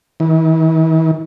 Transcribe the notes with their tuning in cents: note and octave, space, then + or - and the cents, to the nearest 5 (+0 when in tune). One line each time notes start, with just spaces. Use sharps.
E3 -45